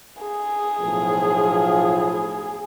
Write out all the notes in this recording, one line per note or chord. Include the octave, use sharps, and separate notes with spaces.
G#4
B1 A2 F3